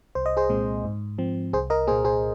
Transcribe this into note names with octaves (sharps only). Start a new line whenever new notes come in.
C2 C5
D#5
G#4 C5
A#2 G#3 C4
G#2
F3 C4
C2 G#4 C5
A#4 D#5
A#2 A#3 G#4 C5
G#4 C5